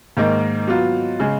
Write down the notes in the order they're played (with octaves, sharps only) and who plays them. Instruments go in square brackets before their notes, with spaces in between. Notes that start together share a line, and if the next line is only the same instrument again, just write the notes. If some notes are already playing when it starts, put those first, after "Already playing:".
[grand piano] G#2 D#3 A#3 D#4 A#4
F#3 B3 F4
C#3 G#3